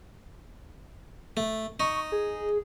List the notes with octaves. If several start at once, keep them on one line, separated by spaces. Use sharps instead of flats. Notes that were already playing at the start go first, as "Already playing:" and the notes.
A3
D#4 C#6
G#4